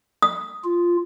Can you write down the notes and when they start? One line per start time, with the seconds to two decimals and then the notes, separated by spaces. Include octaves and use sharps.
0.22 D#6
0.64 F4